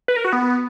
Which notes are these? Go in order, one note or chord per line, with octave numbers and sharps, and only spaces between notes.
B4
A#4
F#4
B3